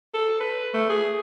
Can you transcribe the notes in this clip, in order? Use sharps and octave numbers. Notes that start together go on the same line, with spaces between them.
A4
B4
A3
G#4